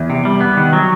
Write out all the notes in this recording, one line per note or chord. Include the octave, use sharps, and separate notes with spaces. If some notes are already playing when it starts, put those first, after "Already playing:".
Already playing: E2
C3
G3
B3
D#3
F#3